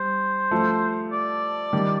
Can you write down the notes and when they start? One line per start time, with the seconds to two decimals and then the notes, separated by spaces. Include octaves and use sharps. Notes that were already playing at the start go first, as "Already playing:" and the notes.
Already playing: G3 C5
0.51 F3 A3
1.12 D5
1.73 D#3 G3